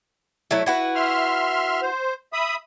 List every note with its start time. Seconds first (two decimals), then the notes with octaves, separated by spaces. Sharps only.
0.51 F#3 A3 E4
0.66 E4 F#4 B4
0.95 E5 C6 F6
1.82 C5
2.33 E5 B5 D#6